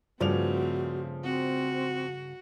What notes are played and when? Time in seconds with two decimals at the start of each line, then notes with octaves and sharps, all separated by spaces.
0.20 G2 C#3 F3 A3 C4 F#4 D5 F7
1.24 C4 F#4